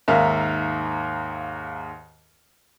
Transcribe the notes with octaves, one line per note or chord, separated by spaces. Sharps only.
D#2 G#2 A#4 E5 F5